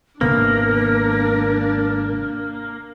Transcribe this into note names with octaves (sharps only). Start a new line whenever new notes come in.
G#1 C3 A#3 B3 D4 A#4